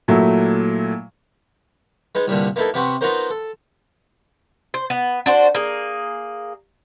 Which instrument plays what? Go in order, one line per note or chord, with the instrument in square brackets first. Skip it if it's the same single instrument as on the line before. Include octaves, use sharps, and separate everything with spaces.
[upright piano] A#2 F#3 A3 E4
[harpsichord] G#3 B3 D#4
C2 G2 A#2 D3
A#3 B3 D#4 E4 A4
C3 B3 C4 F#4
B3 D#4 F4 F#4 A#4 C5
A4
[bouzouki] C5
B3
D4 F#4 C5
A#3 G#4